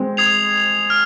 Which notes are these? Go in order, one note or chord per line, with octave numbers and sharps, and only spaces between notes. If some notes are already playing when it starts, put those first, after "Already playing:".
Already playing: G#3 C4
D#6 G#6 C7 F7
F6